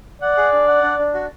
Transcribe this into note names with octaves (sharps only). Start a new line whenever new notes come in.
D5 F#5
G#4
D4
F#5
D4
D4
F#4